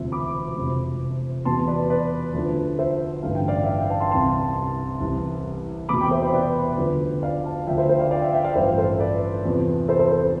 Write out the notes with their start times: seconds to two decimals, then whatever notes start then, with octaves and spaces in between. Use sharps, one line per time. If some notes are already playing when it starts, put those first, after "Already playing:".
Already playing: E1 D2 C3 F3 E5
0.12 B5 D6
0.56 F1 F2 C3
1.45 E2 B2 A5 C6
1.67 B4 D5
1.90 B4 D5
2.34 D2 D3 F3
2.79 C5 E5
3.23 A1 G2 D3 F5
3.35 G5
3.48 D5 F5
3.63 E5
3.67 D5 F5
3.78 E5 G5
3.90 F5 A5
4.00 A5 C6
4.11 C2 C3 E3 A5 C6
5.00 C2 C3 E3
5.89 E2 B2 B5 D6
6.01 G5 B5
6.11 C5 E5
6.22 C5 E5
6.33 B4 D5
6.78 D2 D3 F3
7.23 D5 F5
7.44 F5 A5
7.67 D2 D3 F3 E5 G5
7.78 C5 E5
7.89 C5 E5
8.00 D5 F5
8.11 D5 F5
8.22 E5 G5
8.33 E5 G5
8.44 D5 F5
8.56 A1 G2 F3 C5 E5
8.78 A4 C5
8.99 B4 D5
9.45 E2 C3 F3
9.88 A4 C5
9.99 A4 C5
10.10 A4 C5
10.22 A4